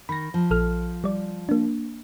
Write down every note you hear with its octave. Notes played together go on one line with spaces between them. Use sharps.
D#3 B5 A#6
F3
A#1 A4 F6
G3 D5
A#3 D4